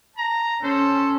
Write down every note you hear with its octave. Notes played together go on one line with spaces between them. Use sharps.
A5 A#5
C#4 A4 C5